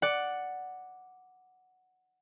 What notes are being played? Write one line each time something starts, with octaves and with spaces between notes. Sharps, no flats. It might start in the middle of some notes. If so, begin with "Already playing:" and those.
D5 F#5